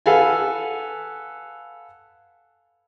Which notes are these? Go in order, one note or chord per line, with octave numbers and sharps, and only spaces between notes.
A4 B4 F5 F#5 G#5